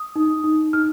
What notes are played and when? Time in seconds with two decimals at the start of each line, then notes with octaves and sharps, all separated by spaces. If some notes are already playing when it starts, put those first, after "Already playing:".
Already playing: D#6
0.16 D#4
0.44 D#4
0.73 D#4 F6